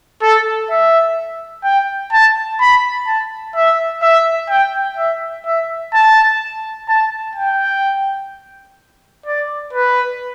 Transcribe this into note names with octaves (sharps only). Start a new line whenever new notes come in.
A4
E5
G5
A5
B5
A5
E5
E5
G5
E5
E5
A5
A5
G5
D5
B4